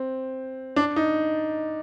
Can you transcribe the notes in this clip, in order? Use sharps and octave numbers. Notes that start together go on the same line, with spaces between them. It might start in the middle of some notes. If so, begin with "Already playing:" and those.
Already playing: C4
D4
D#4